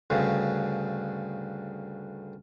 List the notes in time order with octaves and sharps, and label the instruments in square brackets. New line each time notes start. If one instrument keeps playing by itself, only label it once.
[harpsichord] D2 G2 C#3